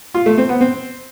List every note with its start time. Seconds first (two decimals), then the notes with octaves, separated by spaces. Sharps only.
0.14 F4
0.26 A3
0.38 C4
0.49 B3
0.61 C4